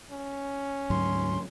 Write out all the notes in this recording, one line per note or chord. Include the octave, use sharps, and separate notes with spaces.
C#4
D2 G#2 F#3 C6